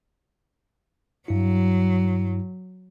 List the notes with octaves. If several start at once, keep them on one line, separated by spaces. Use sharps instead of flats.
G2 F#3 E4